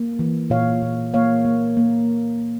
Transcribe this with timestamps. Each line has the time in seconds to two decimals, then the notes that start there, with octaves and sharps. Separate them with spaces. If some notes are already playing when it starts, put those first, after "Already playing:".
Already playing: A#3
0.19 E3
0.50 A#2 C#5 F5
0.82 A#2
1.14 A#3 C#5 F5
1.45 A#3
1.77 A#3